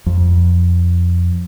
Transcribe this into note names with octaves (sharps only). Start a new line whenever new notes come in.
F2